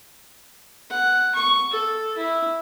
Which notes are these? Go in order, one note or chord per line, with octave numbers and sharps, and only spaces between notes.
F#5
C#6
A4
E4